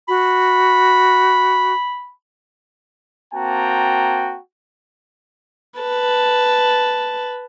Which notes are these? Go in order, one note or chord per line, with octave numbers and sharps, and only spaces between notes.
F#4 B5
A#3 C4 F#4 G5 A5 A#5
B4 A5